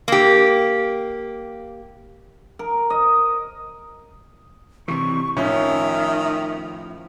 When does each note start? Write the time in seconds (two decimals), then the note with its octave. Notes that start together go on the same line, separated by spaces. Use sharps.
0.08 A#3 G4
2.59 A#4
2.90 D#5
4.88 C3 E3 C#6
5.37 A2 D#3 F3 C#4 E5